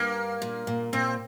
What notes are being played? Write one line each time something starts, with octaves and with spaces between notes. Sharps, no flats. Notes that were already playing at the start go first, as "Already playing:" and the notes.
Already playing: G2 A#3
A#2
A#2
A#2 C4